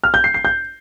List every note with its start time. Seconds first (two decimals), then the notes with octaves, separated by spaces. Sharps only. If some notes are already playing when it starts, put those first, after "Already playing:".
0.04 F6
0.14 G6
0.24 C7
0.34 C7
0.45 G6